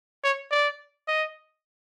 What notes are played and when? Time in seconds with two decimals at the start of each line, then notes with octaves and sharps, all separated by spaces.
0.24 C#5
0.51 D5
1.08 D#5